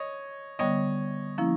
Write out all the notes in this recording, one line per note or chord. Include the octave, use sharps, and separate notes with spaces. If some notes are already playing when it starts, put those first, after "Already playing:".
Already playing: C#5 D#5
D3 G3 B3 C#5 D#5
F3 A#3 C#4 E4